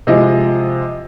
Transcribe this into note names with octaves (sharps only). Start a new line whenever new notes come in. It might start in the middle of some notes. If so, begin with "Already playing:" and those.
C3 F3 G#3 D#5